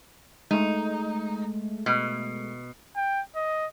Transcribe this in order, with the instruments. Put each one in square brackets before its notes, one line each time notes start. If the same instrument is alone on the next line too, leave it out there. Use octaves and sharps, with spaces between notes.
[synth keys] G#3 A3 [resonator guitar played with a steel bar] D#4
[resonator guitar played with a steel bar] B2
[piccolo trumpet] G5
D#5